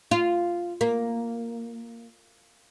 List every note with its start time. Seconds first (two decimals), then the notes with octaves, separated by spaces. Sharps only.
0.11 F4
0.81 A#3